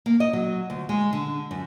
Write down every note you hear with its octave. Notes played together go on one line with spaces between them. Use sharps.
A#3
D#5
F#3
D2
G#3
D3
F#2